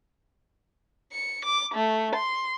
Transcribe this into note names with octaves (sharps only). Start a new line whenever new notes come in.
C#7
D6
A3
C6